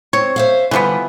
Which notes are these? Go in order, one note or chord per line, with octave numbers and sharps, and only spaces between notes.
C4 C#5
C5 E5 F5
D3 E3 F3 G3 B3